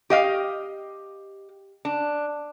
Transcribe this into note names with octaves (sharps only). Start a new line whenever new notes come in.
G4 D#5 F5
D4